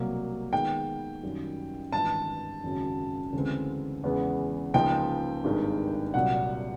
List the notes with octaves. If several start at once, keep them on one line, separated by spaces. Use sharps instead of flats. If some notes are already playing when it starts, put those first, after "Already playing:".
Already playing: C2 B2 F#3 A#3
D#3 G#3 B3 G5
F#2 D#3 G3
G#1 G2 E3 A5
G#1 F#2 C#3 F#3
D2 C#3 E3 G#3 C4
E2 C#3 E3 G#3 B3
C#2 C#3 F3 A#3 D#4 G5
G#1 G2 D#3 G#3
C2 A#2 F#3 F#5